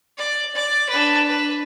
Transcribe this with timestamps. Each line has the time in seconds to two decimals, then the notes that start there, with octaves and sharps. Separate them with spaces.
0.18 D5
0.55 D5
0.89 D4 B4
1.29 B4